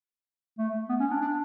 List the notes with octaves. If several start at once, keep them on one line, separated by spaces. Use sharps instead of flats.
A3
B3
C#4
D4
D4